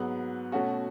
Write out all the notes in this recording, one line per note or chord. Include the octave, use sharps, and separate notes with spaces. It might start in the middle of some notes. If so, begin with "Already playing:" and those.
Already playing: G#2 F#3 B3
B2 A3 C#4 F#4